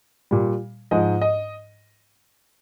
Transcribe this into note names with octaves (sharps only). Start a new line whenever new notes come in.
A#2 G3
G#2 F3 G#3 D#5
D#5